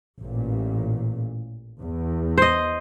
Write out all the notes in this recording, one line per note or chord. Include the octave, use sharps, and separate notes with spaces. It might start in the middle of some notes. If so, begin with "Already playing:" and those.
A1 A#2
E2
C5 D#5